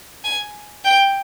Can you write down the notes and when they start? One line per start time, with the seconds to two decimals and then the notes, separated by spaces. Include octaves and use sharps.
0.24 G#5
0.85 G5